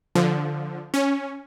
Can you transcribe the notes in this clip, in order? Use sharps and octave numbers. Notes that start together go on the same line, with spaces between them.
D3 F3
C#4